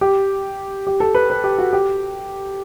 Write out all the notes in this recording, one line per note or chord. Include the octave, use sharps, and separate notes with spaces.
G4
G4
A4
B4
B4
G4
F#4
G4